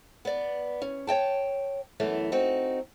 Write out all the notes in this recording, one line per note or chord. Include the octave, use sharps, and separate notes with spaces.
B3 D5
C#4
C#5 D#5 G5 A5
F#2 E3 A3 B3
C4 D#4 F#4